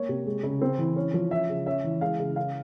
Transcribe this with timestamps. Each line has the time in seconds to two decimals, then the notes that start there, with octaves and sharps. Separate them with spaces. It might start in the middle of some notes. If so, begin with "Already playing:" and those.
Already playing: A#3 C#5
0.09 C3
0.26 G#3
0.43 C#3
0.61 C4
0.78 E3
0.96 C#4
1.14 F3
1.31 C#4 E5
1.49 C#3
1.66 C#4 E5
1.84 E3
2.01 G#3 F5
2.19 C#3
2.36 C#4 F5